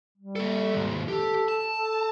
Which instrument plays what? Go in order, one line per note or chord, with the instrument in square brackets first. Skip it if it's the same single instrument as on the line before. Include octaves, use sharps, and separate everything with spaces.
[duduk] G3
[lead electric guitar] A#3 A4
D#2 G#2
[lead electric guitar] G4 [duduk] A4
[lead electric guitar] A5
[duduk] A4